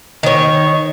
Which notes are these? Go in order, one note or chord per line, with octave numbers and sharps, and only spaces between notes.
D#3 C#5